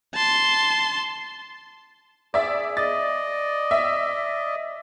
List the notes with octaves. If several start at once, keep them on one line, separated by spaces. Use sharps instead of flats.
A5 C6
G#4 D5 E5
D5 D#5 A6
E5